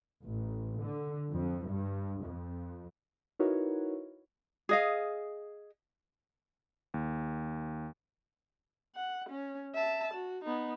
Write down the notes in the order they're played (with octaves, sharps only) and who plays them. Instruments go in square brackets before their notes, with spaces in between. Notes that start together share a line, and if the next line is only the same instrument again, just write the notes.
[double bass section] A1
D3
F2
G2
F2
[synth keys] D#4 E4 F#4 A#4 B4 C#5
[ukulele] G#4 D#5 F5
[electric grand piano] D#2
[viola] F#5
C#4
E5 A5
F#4
B3 D#4